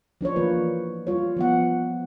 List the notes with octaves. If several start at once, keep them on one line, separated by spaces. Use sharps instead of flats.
F3 D4 C5 C#5
E3 A#3 F4 B4
G3 F4 C#5
F3 B3 F#5